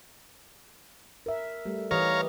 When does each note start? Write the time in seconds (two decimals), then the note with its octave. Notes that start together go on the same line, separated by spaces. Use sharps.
1.26 A#4 E5
1.66 G3 A3
1.91 E3 G4 C#5 D#5 F5 A#5